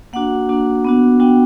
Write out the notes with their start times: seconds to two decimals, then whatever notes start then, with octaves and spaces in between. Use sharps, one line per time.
0.13 A#3 D4 F#4 F#5
0.49 A#3 D4 F#4
0.84 B3 D4 F#4
1.20 B3 D4 F#4 G5